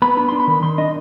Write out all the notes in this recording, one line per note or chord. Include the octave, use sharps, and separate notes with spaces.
B3 B5
D4 B5
D4 C6
B5
D#3
D#3 C6
D4 D#5